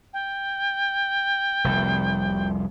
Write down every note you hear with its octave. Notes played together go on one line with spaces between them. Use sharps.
G5
F1 C2